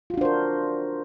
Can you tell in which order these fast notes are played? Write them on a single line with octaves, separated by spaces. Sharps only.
F4 F#4 D4 C5 A#4